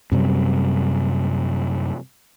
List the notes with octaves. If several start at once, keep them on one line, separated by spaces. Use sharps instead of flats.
F#2 C3 G3